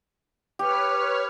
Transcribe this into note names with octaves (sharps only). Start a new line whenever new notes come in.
G4 B4 C#5 F6